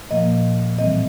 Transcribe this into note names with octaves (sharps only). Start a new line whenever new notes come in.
A#2 F3 A#3 D#5
A2 E3 G3 C4 D#5